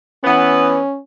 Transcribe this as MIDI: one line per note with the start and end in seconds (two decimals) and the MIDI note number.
0.24 0.78 52
0.24 0.78 59
0.24 0.99 61